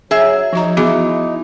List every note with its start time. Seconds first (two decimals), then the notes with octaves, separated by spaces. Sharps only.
0.11 F#3 G#4 E5
0.53 F3 D#4 F#4 A#5
0.77 E3 B3 F#4 G#4